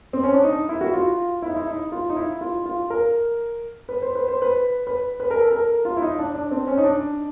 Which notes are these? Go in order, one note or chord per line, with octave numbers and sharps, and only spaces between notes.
C4
C#4
D4
D#4
E4
F#4
F4
E4
D#4
E4
D#4
F4
D#4
E4
F4
F4
A#4
B4
C5
B4
C5
B4
B4
B4
A#4
A4
A#4
F4
E4
D#4
D4
D4
C4
C#4
D#4
D4